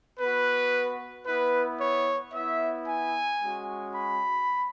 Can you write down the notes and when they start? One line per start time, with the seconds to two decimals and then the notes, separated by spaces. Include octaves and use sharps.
0.20 B3 F#4 B4
1.27 B3 E4 B4
1.80 C#5
2.33 B3 E4 E5
2.87 G#5
3.40 G#3 C#4 F#4
3.94 B5